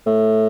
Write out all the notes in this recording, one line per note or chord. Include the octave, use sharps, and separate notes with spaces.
A2